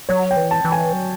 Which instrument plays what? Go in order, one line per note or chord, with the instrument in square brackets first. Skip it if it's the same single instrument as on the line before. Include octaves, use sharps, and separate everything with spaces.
[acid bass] F#3 [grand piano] C#5
[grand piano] G5
[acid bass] E3
[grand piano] A5
[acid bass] E3
[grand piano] G#5
[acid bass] F#3